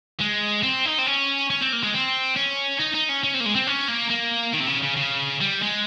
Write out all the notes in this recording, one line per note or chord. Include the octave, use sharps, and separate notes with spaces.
G#3
C4
D#4
C4
C#4
C#4
C4
A#3
G#3
C4
C#4
D#4
D#4
C#4
C#4
C4
A#3
G#3
C4
C#4
A#3
A#3
D#3
C3
C#3
C#3
C#3
G3
G#3